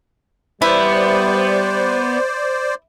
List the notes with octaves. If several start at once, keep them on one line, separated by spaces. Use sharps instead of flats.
G3 B3 E4 C5 D5